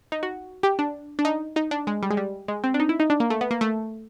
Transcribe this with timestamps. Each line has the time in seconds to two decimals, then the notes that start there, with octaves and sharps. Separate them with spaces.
0.12 D#4
0.23 F#4
0.63 G4
0.79 D4
1.19 D4
1.25 D#4
1.56 D#4
1.71 D4
1.87 G#3
2.03 G3
2.10 G#3
2.17 G3
2.48 G#3
2.64 C4
2.74 D4
2.80 D#4
2.89 E4
3.00 D#4
3.10 D4
3.20 A#3
3.30 A3
3.41 B3
3.51 A#3
3.61 A3